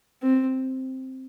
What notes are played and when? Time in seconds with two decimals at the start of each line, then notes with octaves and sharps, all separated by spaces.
0.22 C4